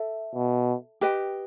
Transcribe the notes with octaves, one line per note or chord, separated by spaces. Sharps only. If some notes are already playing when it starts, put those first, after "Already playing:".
Already playing: A4 E5
B2
G4 B4 D#5 G5